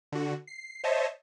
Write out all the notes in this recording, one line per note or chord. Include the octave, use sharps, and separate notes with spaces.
D3 F#4
C7
C5 C#5 D#5 E5 A5